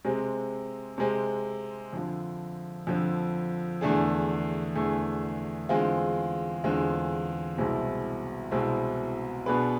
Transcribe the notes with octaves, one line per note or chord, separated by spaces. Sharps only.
C3 G#3 C4
C3 G#3 C4
F2 D3 F3
F2 D3 F3
E2 D3 A3 D4 G#4
E2 D3 A3 D4 G#4
E2 D3 G#3 C4 F4
E2 D3 G#3 C4 F4
C2 B2 G#3 C4 E4
C2 B2 G#3 C4 E4
B2 B3 D4 G#4 B4